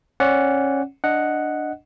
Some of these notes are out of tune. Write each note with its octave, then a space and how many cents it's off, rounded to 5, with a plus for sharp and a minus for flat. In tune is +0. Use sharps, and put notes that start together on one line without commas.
C#4 -20 D5 -25 F#5 +0
D4 +0 D#5 +0 F#5 +0